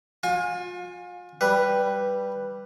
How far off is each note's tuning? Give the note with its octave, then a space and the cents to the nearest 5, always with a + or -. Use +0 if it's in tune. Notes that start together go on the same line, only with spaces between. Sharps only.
F4 +35 G#5 -15
G3 +0 B4 +0